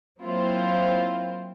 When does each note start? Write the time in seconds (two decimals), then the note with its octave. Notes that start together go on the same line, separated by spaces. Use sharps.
0.21 F#3 A#3 C4 E4 F4 C5